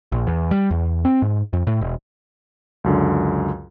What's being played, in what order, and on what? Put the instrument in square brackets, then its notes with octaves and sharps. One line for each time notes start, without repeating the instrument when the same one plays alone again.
[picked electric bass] A#1
E2
G3
E2
C4
G#2
F2
A2
E1
[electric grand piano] C#2 F#2 D3